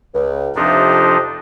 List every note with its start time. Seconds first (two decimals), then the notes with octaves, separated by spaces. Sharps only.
0.14 C#2
0.55 F2 C3 F3 D4 D#4